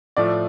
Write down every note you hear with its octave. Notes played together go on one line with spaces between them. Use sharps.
A2 F3 A3 D5